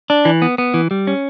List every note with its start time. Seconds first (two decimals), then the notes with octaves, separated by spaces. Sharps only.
0.10 D4
0.25 E3
0.42 B3
0.58 B3
0.74 E3
0.91 G3
1.07 C#4